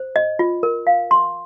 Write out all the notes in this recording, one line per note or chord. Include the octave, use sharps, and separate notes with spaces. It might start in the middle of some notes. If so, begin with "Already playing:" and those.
Already playing: C5
D#5
F4
A#4
F5
C6